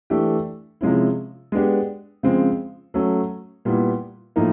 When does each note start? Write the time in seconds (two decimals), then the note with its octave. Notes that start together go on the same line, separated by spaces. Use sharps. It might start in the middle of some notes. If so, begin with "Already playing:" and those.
0.10 E3 A3 D4 G4
0.81 C3 F3 G#3 C#4 E4
1.52 G#3 B3 D4 G4
2.23 C#3 F3 G#3 C4
2.94 F#3 A3 C#4
3.65 A#2 G3 B3 E4
4.36 A2 F3 A#3 D#4